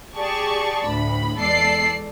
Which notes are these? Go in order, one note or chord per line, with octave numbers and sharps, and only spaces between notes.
G4 G#4 D5 A5 C#6
D2 A2 B5
E2 G#3 A4 D5 C7